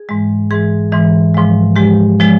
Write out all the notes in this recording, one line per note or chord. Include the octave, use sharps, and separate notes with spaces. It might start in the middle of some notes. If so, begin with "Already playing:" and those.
Already playing: G#4
G#2 E3 G#3
G#2 E3 G#3 G#4
G#2 E3 G#3
G#2 F3 G#3
G#2 F3 G#3 G4
F3 G#3